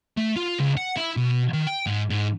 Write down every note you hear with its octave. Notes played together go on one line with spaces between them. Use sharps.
A3
F4
C#2
F#5
E4
B2
D#3
G5
G#2
G#2